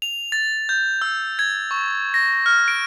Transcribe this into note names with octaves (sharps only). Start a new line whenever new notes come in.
F7
A6
G6
E6
G#6
C#6
A#6
F6
D7